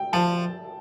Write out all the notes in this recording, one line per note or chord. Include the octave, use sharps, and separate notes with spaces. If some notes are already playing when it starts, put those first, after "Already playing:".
Already playing: G5
F3 A5